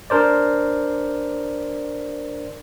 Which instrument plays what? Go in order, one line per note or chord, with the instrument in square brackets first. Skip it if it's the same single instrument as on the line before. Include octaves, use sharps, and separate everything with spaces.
[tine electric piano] D4 A#4 C5 D5